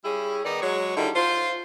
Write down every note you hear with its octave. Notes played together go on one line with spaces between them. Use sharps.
G3 C#4 E4 G#4
D#3 B3 D#4 D5
F#3 G#3 C#5
D3 D#3 G3 D#4 E4
F4 C5